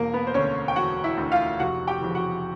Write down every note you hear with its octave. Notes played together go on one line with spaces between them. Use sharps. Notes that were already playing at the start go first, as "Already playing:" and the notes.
Already playing: E1 A#3 A#4
B3 B4
C5
D2 D3 C#4 C#5
G5
E1 F#4 F#5
E4 E5
D2 D3
F4 F5
F1 F#4 F#5
G4 G5
F2 C#3 E3
F#4 F#5